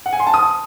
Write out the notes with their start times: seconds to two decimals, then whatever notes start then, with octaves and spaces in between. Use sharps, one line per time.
0.06 F#5
0.13 G#5
0.20 C6
0.27 A5
0.34 D#6